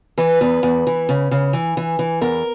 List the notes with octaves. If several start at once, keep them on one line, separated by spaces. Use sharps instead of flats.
E3 B4
E2
E2
E3
C#3
C#3
E3
E3
E3
E2 A#4